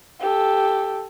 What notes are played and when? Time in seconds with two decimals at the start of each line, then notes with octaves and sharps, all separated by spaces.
0.21 G4 A4